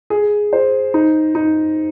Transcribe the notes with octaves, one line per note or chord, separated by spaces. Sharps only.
G#4
C5
D#4
D#4